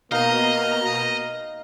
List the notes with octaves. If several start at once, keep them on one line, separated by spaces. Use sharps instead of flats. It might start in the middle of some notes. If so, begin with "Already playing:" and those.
B2 A#3 D#4 D#5 F5 A#5